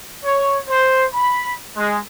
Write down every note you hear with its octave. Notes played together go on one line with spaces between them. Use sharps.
C#5
C5
B5
G#3